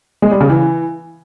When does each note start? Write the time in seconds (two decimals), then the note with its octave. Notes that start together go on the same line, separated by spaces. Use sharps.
0.22 G#3
0.31 G3
0.41 C#3
0.50 E3